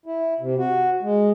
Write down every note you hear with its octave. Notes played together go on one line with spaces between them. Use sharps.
E4
C3
F#4
G#3